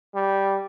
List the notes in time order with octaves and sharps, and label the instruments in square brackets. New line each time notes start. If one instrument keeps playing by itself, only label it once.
[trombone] G3